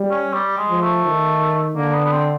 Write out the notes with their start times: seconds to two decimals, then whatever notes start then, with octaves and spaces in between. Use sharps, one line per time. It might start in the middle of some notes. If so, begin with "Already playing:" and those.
Already playing: G3
0.11 C#4
0.33 G3
0.58 G#3
0.69 F3
0.81 A3
1.05 D#3
1.76 D3 A#3
1.94 B3
2.05 B3
2.12 C4